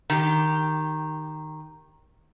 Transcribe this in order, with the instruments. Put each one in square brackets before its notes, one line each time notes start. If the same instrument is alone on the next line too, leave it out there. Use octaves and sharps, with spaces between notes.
[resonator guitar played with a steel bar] D#3 G4